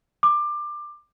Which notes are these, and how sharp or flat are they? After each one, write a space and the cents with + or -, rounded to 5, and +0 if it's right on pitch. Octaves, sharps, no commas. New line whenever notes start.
D6 +20